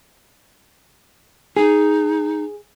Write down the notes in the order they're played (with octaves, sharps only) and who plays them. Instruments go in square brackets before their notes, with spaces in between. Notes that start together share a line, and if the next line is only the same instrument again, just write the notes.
[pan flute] D#4 [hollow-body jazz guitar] G#4